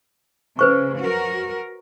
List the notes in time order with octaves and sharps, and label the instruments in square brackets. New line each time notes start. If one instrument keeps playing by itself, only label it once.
[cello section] C#3 [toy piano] B4 C5 C#6
[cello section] F#4 A#4